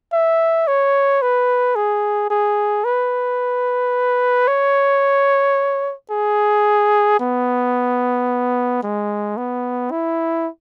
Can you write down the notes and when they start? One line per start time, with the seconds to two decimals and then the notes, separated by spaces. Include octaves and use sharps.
0.13 E5
0.68 C#5
1.22 B4
1.76 G#4
2.30 G#4
2.85 B4
4.48 C#5
6.11 G#4
7.20 B3
8.83 G#3
9.37 B3
9.91 E4